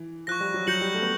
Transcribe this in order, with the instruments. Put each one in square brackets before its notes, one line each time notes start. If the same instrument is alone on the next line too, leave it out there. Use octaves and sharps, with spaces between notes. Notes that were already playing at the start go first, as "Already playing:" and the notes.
Already playing: [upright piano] E3
[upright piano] F3 [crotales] C#6 F#6 A#6
[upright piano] G3
F#3
[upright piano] F#3 [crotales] G6 A#6 C#7 F#7
[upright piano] G3
A3
B3